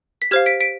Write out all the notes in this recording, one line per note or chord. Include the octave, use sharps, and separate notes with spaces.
B6
G4 C5 F5 F6 G#6
B6 D7
B6 D7